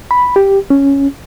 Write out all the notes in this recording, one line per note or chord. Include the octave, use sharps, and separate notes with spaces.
B5
G4
C#4